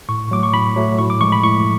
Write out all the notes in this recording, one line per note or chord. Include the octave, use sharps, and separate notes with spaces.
A2 C#6
F#3 A3 D6
C#6
A2 B5
F#3 A3
A2 C#6
D6
F3 G#3 C#6
B5
A2 C#6